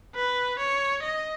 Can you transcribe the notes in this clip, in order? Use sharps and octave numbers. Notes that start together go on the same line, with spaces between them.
B4
C#5
D#5